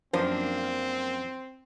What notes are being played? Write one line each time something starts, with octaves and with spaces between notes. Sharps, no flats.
F#2 F3 A#3 C4 D4 C5